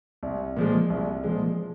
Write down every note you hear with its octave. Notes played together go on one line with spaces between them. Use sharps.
C2
A#2 F3 G#3
C2
A#2 F3 G#3